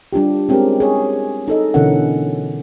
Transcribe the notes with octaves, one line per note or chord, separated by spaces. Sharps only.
G3 D4 F4 G4
G#3 C4 C#4 G4 G#4 A#4
G#4 C#5
D#4 A4 D#5
B2 D3 E3 C#4 A#4 F#5